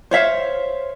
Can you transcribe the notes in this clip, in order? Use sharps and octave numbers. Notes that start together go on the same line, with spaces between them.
C5 C#5 E5 F5